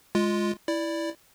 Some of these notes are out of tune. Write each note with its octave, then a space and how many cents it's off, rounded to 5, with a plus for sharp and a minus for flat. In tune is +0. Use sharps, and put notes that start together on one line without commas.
G#3 +0 F4 +0
E4 +0 D5 +0